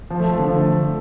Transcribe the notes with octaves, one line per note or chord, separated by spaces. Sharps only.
F3
A3
F3
D3
F3
A3